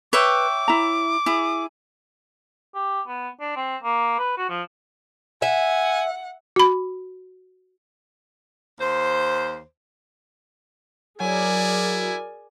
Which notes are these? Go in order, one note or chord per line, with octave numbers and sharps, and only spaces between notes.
B4 C#5 E5 G5 D6
E4 A#5
E4 G#4
G4
B3
D4
C4
A#3
B4
F#4
F3
E5 F#5 G#5
F#4 B5
D#2 C5
F#3 E4 G#4 A#4 D5 G#5